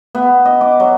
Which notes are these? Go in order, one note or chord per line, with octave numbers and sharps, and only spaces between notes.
B3
D#5
D6
F#3